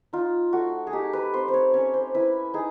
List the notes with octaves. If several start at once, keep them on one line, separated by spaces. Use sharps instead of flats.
D#4 F4
A3 F#4
G#4
D#4 G4
B4
C4 C5
C5
C#5
C#4 C#5
C5
E4 B4
D#4 G#4